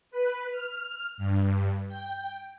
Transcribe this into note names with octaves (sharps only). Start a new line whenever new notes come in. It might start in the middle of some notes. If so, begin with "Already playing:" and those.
B4
F6
G2
G5